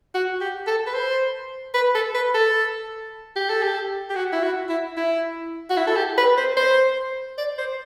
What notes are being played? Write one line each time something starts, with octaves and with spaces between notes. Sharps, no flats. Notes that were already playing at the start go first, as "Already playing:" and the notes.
F#4
G4
A4
B4
C5
B4
A4
B4
A4
G4
A4
G4
G4
F#4
E4
F#4
E4
E4
F#4
E4
A4
G4
B4
C5
C5
D5
C5